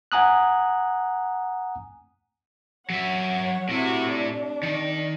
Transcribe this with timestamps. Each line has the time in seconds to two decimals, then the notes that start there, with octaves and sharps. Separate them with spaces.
0.12 F#5 G#5 A#5 D#6 F#6
2.90 F#3 C#5 E5 F#5
3.69 A2 C3 E4 F#4
4.10 D4
4.63 D#3